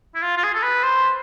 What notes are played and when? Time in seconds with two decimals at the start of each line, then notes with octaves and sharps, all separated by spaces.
0.15 E4
0.23 F4
0.37 F4
0.43 G#4
0.55 A4
0.63 B4
0.83 C5